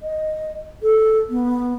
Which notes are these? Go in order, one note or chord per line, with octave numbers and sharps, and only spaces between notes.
D#5
A4
B3